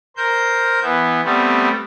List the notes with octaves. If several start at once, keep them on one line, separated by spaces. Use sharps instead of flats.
A#4 C5 G6
E3 B3
G3 A3 B3 C4